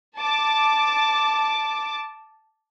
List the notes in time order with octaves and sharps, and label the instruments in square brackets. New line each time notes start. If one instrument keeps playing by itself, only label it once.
[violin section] A5 D6